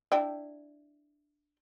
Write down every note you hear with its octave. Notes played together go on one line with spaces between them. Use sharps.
D4 E4 G5